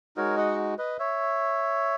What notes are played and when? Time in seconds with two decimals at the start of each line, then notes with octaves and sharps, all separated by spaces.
0.17 G#3 D#4 F#4 A#4 C#5
0.37 D#5 F#5
0.78 B4 D#5
0.99 C#5 E5